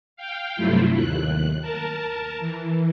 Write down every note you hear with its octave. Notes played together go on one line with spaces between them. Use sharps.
F5 G5
G2 C3 F#3 A3 E4 F4
D#2 F#6
A#4 A5
E3